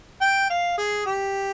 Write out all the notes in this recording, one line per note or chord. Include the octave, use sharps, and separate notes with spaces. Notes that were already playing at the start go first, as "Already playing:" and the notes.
G5
F5
G#4
G4